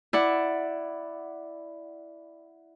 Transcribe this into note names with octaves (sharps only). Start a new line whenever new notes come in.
E4 D5 F#5